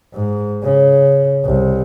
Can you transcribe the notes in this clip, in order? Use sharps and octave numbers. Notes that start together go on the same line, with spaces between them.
G#2
C#3
C2